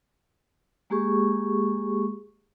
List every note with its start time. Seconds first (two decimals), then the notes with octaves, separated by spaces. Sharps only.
0.90 G#3 A#3 G4 G#4 C#6